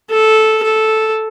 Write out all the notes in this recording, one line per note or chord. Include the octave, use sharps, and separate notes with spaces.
A4
A4